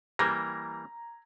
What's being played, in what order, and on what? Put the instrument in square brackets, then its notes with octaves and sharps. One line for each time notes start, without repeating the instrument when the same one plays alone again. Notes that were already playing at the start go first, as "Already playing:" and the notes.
[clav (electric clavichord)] E3 G3 A#3 [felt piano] A#5 G#6 A#6